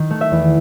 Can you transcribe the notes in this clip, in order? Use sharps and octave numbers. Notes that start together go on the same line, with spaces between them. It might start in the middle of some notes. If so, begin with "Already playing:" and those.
Already playing: D#3
A3
E5
E2